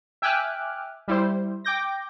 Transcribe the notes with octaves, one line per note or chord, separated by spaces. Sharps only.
E5 G5 G#5 D6 F6 F#6
G3 E4 C5
G5 D6 G6 A#6